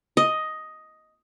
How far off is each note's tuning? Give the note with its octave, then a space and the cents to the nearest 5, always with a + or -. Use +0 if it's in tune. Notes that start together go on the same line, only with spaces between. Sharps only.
D#5 +5